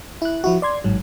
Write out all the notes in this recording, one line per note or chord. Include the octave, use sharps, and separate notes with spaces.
E4 F#6
F3 E4 F#4
D5 C6 G#6
A1 G#2 F#3